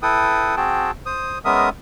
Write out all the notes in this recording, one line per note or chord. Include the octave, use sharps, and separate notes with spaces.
E4 A4 B4 G5 D#6
C4 F#4 G#4 G5 A5
C5 D#6
G#3 B3 C#4 A#4 E5 D#6